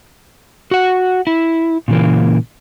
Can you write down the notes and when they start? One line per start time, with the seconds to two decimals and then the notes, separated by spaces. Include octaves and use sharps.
0.71 F#4 F#5
1.27 E4
1.88 A#2 C#3 E3 A#3